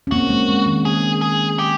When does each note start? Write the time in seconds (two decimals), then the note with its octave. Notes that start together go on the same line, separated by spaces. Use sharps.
0.07 C#4
0.11 A#3 C4 F#4
0.30 G#3 A#3
0.49 G#3
0.66 D#3
0.85 G#4
1.21 G#4
1.59 G4